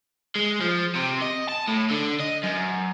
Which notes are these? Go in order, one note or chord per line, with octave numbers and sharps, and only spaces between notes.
G#3
F3
C3
D#5
A5
A2
D3
D#5
F#2